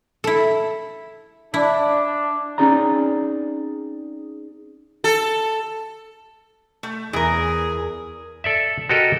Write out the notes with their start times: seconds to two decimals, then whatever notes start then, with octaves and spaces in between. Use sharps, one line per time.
0.24 E4 A4
1.54 D4 E4
2.58 C4 C#4 D#4 G#4 D5 A#5
5.04 A4
6.83 A3
7.13 E2 E3 G#4 A#4
8.44 A4 D5 E5
8.89 F#4 G4 A4 A#4 D#5